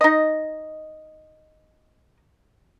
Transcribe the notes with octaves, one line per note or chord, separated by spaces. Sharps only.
D#4 D#5